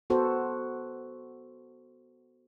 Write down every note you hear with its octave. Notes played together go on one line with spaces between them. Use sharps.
B3 F#4 A4 C5